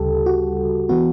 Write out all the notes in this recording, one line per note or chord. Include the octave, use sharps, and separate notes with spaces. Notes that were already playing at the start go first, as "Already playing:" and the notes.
Already playing: D2 C#3 G3 G4 A4
F#4
E3 B3 F#4